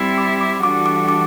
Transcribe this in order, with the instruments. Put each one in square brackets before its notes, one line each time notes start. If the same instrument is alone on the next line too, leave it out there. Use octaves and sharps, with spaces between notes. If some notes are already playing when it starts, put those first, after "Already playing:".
Already playing: [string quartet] G3 C4 E4
[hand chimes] D6
D6
[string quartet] E3 G3 D4 F#4 A4 [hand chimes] D6
[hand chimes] D6
D6